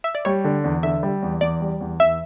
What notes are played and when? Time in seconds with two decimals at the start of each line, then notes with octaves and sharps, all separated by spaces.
0.04 E5
0.15 D5
0.25 G3 C#5
0.44 D3
0.64 E2
0.83 D3 E5
1.03 G3
1.23 E2
1.41 E2 D5
1.61 G3
1.81 E2
2.00 E2 E5